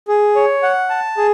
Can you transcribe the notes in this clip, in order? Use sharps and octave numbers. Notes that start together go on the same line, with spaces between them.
G#4
C#5
F#5
A5
G#4